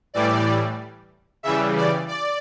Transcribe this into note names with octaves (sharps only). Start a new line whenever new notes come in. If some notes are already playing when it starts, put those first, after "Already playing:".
A2 E3 G3 D5
C#3 E3 G3 E5
D5
D5